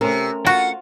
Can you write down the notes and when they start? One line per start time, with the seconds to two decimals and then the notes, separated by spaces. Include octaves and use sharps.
0.01 C3 A3 C#4 A#4
0.46 F4 F#4 F#5 G5